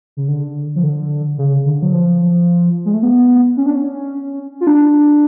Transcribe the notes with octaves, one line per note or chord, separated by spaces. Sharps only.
C#3
D3
F3
D3
C#3
D3
F#3
F3
G#3
A3
B3
C#4
D4
C#4
F4
D4